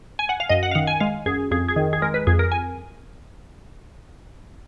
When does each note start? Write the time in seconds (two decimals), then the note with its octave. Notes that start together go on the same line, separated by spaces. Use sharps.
0.19 G#5
0.29 F#5
0.40 F5
0.50 F#2 D#5
0.63 F#5
0.71 F5
0.75 D#3 F#5
0.87 G#5
1.00 G#3 F5
1.26 F#2 G#4
1.51 F2 G#4
1.69 G#4
1.76 D#3
1.93 G#4
2.02 G#3 A#4
2.14 B4
2.27 F2 G#4
2.39 A#4
2.52 G#5